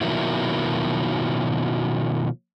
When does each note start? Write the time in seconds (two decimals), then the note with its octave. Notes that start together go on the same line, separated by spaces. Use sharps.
0.01 B2 D#3 F3 F#3 A#3 E4